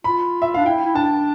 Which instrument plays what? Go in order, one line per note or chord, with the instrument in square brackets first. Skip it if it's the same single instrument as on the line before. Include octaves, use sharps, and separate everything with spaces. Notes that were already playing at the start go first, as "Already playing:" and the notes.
[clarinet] F4 [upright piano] B5
[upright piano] E5
[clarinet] D4 [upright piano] F5
[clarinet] E4 [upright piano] G5
[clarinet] E4
[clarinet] D4 [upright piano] A5